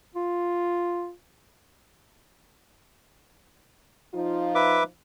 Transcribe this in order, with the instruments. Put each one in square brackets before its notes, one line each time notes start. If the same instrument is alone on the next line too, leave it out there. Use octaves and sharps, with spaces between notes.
[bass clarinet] F4
[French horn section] F3 D#4 F4
[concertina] B4 E5 D6